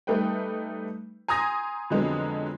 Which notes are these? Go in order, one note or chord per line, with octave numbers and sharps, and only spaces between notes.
G3 A3 D#4 B4 G5
G#5 A#5 C6 D#6 G#6 A#6
F2 D3 F3 F#3 G#3 B3